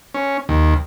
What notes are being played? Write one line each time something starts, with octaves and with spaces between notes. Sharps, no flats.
C#4
D#2